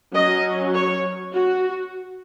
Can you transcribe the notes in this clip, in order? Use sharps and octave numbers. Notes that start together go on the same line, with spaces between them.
F#3 C#4 D#5
C#5
F#4